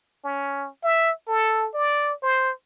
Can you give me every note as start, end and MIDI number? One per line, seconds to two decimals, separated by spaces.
0.24 0.68 61
0.84 1.11 76
1.27 1.68 69
1.74 2.13 74
2.23 2.51 72